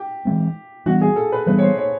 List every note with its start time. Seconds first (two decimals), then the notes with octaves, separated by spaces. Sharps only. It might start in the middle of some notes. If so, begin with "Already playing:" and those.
Already playing: G4
0.25 E3 G#3 C4
0.86 E3 G3 B3 D4 F#4
1.01 G#4
1.16 A4
1.32 B4
1.46 E3 G3 B3 D4 B4
1.58 C#5
1.62 C5
1.78 C#5